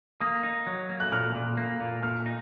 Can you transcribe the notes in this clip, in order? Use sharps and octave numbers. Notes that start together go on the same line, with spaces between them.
A#3 D#6
D#4
F#3
A#3
F#6
A#2 F6
A#2
A#3
A#2
A#2 F6
D#4